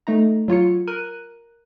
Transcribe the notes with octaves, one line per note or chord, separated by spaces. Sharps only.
A3 D#4 A#5
F#3 F4 C#5 C#7
A#4 F#6 D#7